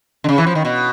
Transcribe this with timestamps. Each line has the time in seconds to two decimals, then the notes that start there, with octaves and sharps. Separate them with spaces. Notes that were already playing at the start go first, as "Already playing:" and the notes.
0.24 D3
0.29 C#3
0.38 E3
0.46 F3
0.55 D#3
0.65 B2